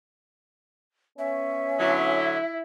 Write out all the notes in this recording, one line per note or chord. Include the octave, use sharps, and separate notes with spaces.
B3 C#4 E5
D3 F#3 E4